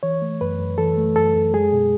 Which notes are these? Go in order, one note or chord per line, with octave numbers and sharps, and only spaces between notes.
E3 C#5
A3
F#2 B4
F#2
E3 A4
A3
F#2 A4
F#2
G#3 G#4
B2